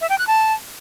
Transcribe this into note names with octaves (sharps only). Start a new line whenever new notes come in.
E5
G5
F#6
A5